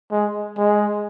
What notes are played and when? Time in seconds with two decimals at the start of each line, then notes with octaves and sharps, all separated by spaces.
0.11 G#3
0.57 G#3